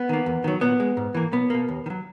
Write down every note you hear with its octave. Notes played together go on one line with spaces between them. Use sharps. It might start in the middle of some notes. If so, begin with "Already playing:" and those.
Already playing: B3
D#3 A#3
E2
D#3 F#3
A#2 B3
G#3
G#2
E3 A#3
B1 B3
B2 A#3
D#2
D#3
F#3